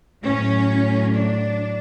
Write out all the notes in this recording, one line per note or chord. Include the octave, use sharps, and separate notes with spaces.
A2 F#3 C#4
D4